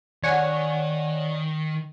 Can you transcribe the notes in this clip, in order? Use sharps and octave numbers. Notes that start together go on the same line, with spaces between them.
D#3 C#5 D5 F#5 G#5